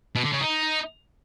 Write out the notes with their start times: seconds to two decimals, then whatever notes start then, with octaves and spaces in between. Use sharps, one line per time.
0.15 B2
0.24 D3
0.33 C#3
0.41 D#4